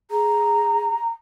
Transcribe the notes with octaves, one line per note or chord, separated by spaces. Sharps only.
G#4 A#5